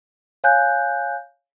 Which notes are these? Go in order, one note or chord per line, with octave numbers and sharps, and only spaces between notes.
C#5 F5 G#5 F#6 G6